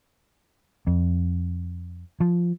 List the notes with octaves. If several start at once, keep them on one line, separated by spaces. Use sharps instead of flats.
F2
F3